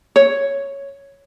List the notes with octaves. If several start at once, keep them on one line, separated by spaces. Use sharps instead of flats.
C#5